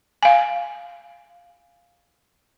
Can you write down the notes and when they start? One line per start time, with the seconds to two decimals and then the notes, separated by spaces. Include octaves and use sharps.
0.23 F5 G#5